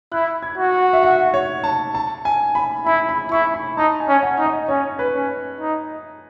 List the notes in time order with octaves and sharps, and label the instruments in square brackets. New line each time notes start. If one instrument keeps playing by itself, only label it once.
[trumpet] E4 [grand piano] F#6
[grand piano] G#6
[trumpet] F#4
[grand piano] E5
F#5
C#5
A5
A5
G#5
B5
[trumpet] E4 [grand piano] B5
[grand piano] B5
[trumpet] E4 [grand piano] C#6
[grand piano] B5
[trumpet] D#4 [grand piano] A5
[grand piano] G#5
[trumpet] C#4
[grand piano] F#5
[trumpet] D#4
[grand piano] D#5
[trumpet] C#4 [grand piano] C#5
[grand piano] B4
[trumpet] C#4
D#4